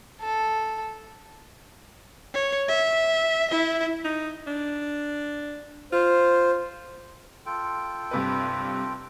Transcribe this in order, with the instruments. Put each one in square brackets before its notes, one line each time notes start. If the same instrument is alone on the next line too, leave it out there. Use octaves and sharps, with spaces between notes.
[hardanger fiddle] A4
[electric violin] C#5
E5
E4 E5
[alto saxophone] D#4
D4
[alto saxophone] F4 [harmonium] C5
[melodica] F4 A4 G5
[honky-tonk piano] G2 C3 B4